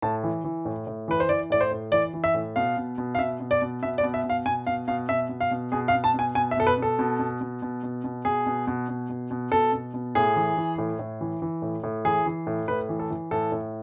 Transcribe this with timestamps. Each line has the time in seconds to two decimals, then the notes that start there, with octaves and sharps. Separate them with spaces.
0.02 A2 A5
0.23 E3
0.44 E3
0.65 A2
0.87 A2
1.08 E3 B4
1.20 C5
1.29 E3 D5
1.50 A2 D5
1.61 C5
1.71 A2
1.92 E3 D5
2.14 E3
2.24 E5
2.34 A2
2.56 B2 F5
2.77 B2
2.98 B2
3.15 F5
3.19 B2 E5
3.40 B2
3.51 D5
3.62 B2
3.83 B2 E5
3.98 D5
4.03 B2
4.14 E5
4.24 B2
4.30 F5
4.46 B2 G#5
4.67 B2 F5
4.88 B2 F5
5.09 B2 E5
5.29 B2
5.41 F5
5.51 B2
5.72 B2 G#4
5.88 F5
5.93 B2
6.04 A5
6.14 B2 G#5
6.35 B2 G#5
6.51 E5
6.57 B2 A4
6.67 B4
6.78 B2 A4
6.99 B2
7.19 B2
7.41 B2
7.62 B2
7.83 B2
8.04 B2
8.25 B2 G#4
8.46 B2
8.67 B2
8.88 B2
9.10 B2
9.31 B2
9.51 B2 A4
9.73 B2
9.94 B2
10.15 A2 G#4
10.36 E3
10.57 E3
10.78 A2
10.99 A2
11.21 E3
11.42 E3
11.62 A2
11.83 A2
12.05 E3 G#4
12.26 E3
12.47 A2
12.68 A2 B4
12.89 E3
12.99 A4
13.10 E3
13.31 A2 A4
13.52 A2